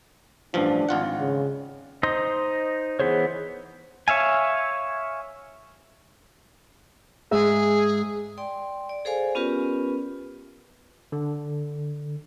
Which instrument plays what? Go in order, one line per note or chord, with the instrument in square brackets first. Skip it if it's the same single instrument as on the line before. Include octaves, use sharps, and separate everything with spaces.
[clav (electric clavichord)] A1 G2 F3 [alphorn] D4
[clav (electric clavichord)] G#1 F4 F#5
[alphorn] C#3
[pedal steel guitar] D#4 C5 D#5 C6 D#6
E3 B3 G#4 C5 C#5
C#5 E5 F5 G#5
[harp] G#2 E5 [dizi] G#4
[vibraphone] D5 G5 C6
D5
G#4 A4 C5 D5 F5 G#5
B3 C#4 F4 G4 A#4 B4
[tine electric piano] D3